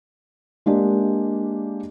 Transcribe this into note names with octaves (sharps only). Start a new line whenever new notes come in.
G#3 A#3 D4 G4 D5